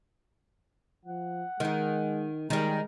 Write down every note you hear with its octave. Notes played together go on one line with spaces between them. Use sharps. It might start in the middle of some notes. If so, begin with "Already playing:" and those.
F3 F#5
D#3 G#3 D#4
D#3 G3 G#3 A#5